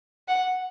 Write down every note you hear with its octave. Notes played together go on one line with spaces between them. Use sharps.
F#5